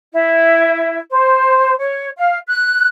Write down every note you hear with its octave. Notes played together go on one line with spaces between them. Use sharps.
E4
C5
C#5
F5
F#6